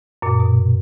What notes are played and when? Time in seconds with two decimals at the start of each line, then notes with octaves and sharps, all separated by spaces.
0.22 F#2 A#2
0.40 B2